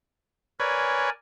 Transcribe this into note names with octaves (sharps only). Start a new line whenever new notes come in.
A#4 B4 C#5 D5 G#5